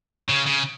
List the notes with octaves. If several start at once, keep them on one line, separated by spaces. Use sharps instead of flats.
C#3
C#3